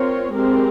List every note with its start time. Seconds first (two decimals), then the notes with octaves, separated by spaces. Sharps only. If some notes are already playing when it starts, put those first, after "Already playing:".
Already playing: C4 F4 A#4 C#5
0.33 G#3 C4 G4 A#4